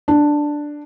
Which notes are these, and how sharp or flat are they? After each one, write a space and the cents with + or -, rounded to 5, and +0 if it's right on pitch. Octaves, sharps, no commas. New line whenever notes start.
D4 +5